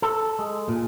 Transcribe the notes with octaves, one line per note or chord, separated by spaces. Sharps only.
A4
G#3
A#2